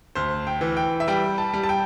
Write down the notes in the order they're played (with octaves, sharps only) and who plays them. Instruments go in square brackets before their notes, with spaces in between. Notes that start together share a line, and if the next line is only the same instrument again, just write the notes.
[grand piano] D2 C5
G5
E3
G5
E5
G3 G5
A5
G3
A5
G5